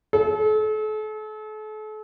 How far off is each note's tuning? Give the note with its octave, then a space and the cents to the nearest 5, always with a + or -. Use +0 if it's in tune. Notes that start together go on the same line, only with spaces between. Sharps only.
A4 -40